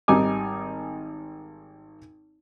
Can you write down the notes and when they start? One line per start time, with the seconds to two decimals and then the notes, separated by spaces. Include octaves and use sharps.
0.08 G#1 G3 D#4 G#5 D6